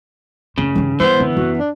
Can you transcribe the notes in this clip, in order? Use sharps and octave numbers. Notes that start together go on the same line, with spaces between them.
F#1 C#3 A3
G2 D#3
G2 E3 B3 C5
F#2 D3
F#2 F#4
D4